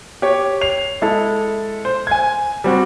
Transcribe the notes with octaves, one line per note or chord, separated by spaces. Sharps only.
G4 C#5
C7 F7
G#3 E4 A4 A5
C5
G#5 G#6
G3 C4 F#4